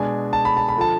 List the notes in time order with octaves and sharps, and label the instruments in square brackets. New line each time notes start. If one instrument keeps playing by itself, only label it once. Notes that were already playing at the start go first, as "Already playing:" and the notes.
Already playing: [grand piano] B2 G#3 D4 G#5
A5
B5
A5
B5
D3 F3 A5